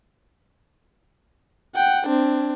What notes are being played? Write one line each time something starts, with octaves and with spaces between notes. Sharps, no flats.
F#5 G5
C4 D4